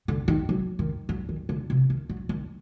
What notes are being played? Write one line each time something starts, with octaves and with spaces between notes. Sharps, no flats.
D3
D#3
F#3
D#3
F#3
D#3
D3
C3
D#3
F#3
D#3